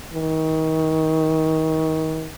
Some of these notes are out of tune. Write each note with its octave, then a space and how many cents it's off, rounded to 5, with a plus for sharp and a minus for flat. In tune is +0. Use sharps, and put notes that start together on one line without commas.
D#3 +30